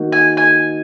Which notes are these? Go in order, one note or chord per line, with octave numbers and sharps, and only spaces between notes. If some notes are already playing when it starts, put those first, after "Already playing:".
Already playing: D#3 A#3 D#4 F#4
G#5
G#5